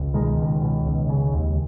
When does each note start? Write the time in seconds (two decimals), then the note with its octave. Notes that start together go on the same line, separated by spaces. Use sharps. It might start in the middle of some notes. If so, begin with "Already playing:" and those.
Already playing: C#2
0.14 B2 D#3 G#3
0.38 C#2
0.61 B2
0.86 C#2
1.09 C#3
1.33 D#2